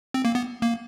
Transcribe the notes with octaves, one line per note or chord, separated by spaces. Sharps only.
C4
A#3
B3
A#3